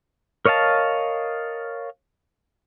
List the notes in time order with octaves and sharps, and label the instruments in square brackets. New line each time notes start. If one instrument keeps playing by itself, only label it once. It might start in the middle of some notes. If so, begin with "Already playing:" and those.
[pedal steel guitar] A#4 C#5 D#5 F5 A5